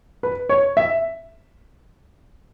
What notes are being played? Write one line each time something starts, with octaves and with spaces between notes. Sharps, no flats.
B4
C#5
E5